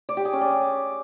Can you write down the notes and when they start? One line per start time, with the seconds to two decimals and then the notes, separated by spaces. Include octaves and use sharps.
0.09 D5
0.17 G4
0.25 G#4
0.33 C#4
0.41 D5